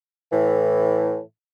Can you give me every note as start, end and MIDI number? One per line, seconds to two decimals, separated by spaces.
0.32 1.19 45
0.32 1.19 52